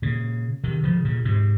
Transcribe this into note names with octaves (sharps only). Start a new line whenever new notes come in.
A#2 C#3
C3 D#3
C#3 F3
A#2 C#3
G#2 C3